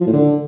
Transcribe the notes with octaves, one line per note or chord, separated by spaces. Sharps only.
F3
A2
D3